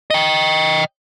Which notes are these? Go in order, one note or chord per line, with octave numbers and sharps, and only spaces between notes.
D#5 G5